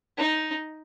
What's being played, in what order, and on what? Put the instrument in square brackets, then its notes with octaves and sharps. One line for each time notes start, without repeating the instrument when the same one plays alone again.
[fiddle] D#4